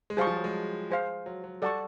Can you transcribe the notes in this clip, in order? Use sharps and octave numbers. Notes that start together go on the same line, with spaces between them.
G#3
G3 G#4 C5 F5 A5 C#6
F3
F#3
G#3
G#4 C5 F5
F#3
F#3
G3 A4 D5 F#5 A5 C#6